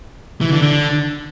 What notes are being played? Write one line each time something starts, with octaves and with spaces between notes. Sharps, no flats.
E3
D3
D3